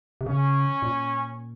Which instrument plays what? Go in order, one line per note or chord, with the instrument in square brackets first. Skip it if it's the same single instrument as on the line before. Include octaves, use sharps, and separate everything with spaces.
[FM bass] C3
[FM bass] C#3 [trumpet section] C#4
[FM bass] A#2